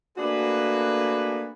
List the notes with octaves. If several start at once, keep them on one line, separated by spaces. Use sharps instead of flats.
A3 A#3 D4 F#4 G#4 B4